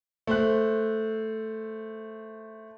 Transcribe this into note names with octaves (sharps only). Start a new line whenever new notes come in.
A3 C5 F#6